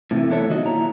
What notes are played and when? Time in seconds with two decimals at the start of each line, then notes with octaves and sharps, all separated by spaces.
0.11 A2 C3 D#3 E3 A3
0.29 E2 B3 E4 A4 C#5 E5
0.49 D#3 F#3 F#4 D#5
0.65 A#2 E4 A#5